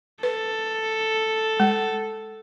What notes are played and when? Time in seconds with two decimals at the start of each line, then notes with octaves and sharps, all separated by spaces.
0.23 A4 B4
1.60 G#3